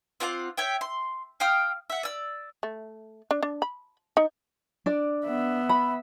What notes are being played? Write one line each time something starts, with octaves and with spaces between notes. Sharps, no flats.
C4 F4 F#5 D6
C#5 E5 G5
C6
F5 G5 D#6 F6
E5 F#5
D5 E6
A3
D4
D4
B5
D#4
D4 D5
B3 E5
B5